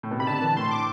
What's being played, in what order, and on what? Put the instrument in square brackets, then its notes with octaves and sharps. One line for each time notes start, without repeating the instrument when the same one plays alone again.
[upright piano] A2
B2
[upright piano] C3 [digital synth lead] B5
[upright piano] D3 [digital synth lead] A5
[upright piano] E3
[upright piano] A2 [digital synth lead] C6
[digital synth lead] D6